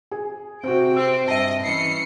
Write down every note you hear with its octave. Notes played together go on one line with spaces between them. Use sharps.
G#4
C3 C4 F#4 G5
C4 E6
G2 D#5 E5 A5
E3 C#4 C7 C#7